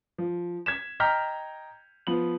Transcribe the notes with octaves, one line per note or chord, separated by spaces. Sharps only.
F3
G#6 B6 E7
D#5 G5 A#5 F6 G6 B6
F3 B3 F#7